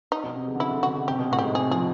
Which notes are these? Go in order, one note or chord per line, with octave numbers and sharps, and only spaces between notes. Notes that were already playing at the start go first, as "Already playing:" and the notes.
D#4
B2
C3
C#3
D3
C#3 E4
D3
C#3
D3 F#4
C#3
C3 G4
B2
A2 F#4
G#2 G4
C3 G#4
F3 G#4